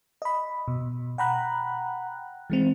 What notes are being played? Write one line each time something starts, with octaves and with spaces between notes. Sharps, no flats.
D#5 B5
B2
F#5 G5 A#5 B5 F#6
E3 G#3 C4